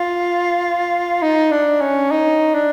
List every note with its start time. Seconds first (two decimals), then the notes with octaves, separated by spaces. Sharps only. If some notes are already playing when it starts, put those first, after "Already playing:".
Already playing: F4
1.22 D#4
1.52 D4
1.81 C#4
2.11 D#4
2.54 D4